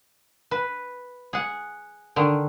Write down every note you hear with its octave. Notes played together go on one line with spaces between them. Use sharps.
B4
G#4 F#5
D3 D#3